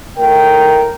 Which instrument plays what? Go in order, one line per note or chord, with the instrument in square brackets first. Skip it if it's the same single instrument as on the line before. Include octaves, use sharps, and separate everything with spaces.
[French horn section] A2 A#4 [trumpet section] G5